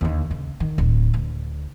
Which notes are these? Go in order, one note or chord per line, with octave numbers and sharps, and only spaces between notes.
D#2 D3
C#2
D#3
D1
D2